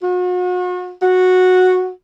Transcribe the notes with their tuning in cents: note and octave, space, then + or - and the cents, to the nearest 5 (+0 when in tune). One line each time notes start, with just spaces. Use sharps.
F#4 -40
F#4 -10